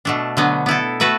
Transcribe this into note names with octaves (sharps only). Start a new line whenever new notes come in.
B2 A3 D4
D3 F#3 B3
B3 E4 A4
A3 F#4 B4 E5